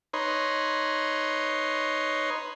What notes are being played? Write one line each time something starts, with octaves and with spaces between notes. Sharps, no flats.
D#4 B4 C#5 C6